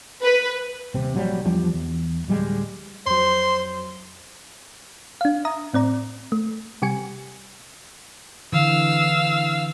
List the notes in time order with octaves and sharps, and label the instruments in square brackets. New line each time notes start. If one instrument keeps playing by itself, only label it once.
[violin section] B4
[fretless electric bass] D#1 C3 C4
A#1 F#3 G3
E2 F3 G3 D4
E2
D1 G3 G#3
[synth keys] F2 F#3 [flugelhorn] C5 [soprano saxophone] C6
[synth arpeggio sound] D4 F5
E5 A#5 D#6
A2 C4 D5 A#5
A3
C3 G3 G4 G#5 C#7
[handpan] D3 E3 [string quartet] F5 E6